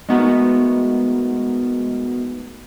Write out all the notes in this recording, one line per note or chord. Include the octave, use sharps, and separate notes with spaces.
G#3 A3 B3 D#4 F#4 A#4